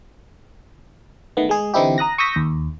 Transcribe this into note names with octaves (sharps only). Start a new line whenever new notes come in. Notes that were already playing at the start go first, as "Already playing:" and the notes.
D#3 A3 B3
G#3 G#4
D3 E3 C4 D#4 E4 G4
A#5 D#6 F#6 A#6
C#6 D#6 E6 G6 A#6 B6
D#2